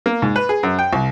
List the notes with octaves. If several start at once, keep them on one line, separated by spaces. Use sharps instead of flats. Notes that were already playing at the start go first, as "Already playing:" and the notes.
A#3
G#2
B4
G#4
F#2
G5
C2